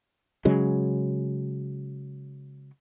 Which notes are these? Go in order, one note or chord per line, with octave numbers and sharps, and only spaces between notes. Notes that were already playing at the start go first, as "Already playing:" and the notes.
C#3 F#3 G#3